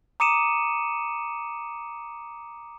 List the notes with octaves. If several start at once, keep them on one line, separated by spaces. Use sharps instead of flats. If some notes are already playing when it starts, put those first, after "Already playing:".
A#5 D6 D#6 C#7 D#7 E7